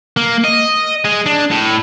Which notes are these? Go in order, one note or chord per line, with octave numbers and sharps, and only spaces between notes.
A#3
D#5
G#3
D4
A2